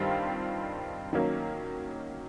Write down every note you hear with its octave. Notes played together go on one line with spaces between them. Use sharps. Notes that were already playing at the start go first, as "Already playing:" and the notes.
Already playing: G2 D#3 G3 C4 F4
D#3 F#3 A#3 C#4